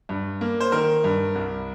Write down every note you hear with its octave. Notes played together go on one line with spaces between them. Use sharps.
G2
A#3
C5
D#3 A#4
G2
C2